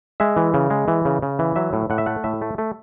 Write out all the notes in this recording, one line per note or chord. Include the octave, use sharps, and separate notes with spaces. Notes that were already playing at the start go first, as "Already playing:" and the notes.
G#3 E5
E3
C#3
G#3
E3
C#3
C#3
E3
F#3 E5
A2
A2 F#5
E5
A3 F#5
A2 E5
A3
A3